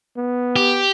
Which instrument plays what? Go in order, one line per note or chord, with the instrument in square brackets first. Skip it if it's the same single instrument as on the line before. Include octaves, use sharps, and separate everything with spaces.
[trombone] B3
[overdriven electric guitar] G4